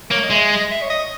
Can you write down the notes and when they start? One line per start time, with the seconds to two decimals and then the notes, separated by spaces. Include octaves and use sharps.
0.11 A#3 C#5
0.24 D#5
0.31 G#3 E5
0.51 D#5
0.70 E5
0.82 C#5
0.90 D#5